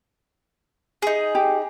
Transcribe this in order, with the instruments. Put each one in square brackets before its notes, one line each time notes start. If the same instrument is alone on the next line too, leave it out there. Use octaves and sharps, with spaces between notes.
[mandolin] D#4 G#4
[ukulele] G4